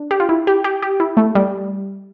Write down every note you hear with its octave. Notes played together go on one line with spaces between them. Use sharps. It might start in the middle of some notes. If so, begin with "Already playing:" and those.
Already playing: D4
G4
F4
E4
G4
G4
G4
E4
A3
G3